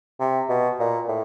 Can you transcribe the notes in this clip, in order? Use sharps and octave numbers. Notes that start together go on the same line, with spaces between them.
C3
B2
A#2
A2